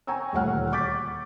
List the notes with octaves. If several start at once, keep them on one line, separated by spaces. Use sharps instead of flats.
G5 G#5 A#5 C#6 E6
D#1 D2 A#2 C#5 F#5 F6
C#6 D6 G6 A6 B6